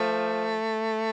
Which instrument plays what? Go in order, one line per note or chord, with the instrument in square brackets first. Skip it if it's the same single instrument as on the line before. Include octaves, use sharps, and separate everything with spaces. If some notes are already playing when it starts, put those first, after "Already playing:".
Already playing: [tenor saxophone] F3 [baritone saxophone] A3